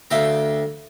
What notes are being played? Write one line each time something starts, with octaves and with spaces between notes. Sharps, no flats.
D2 E5 F5 G5 A#5